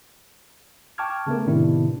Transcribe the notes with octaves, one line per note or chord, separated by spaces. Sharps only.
G5 A5 C#6 D6 F6 G#6
C#3 A3 B3 A#4
A2 C3 D#3 B3 D4 E4